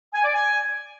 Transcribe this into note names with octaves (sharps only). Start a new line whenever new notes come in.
G#5
D5
G#5